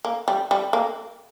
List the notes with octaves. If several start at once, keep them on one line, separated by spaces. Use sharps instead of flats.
A#3
G3
G3
A#3